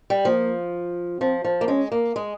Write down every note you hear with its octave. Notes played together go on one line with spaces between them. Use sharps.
G3
F3 A#3
F3 C4
F3
A#3
G#3 C#4
A#3
G#3